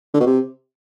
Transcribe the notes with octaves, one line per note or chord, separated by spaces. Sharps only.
D3
B2
C3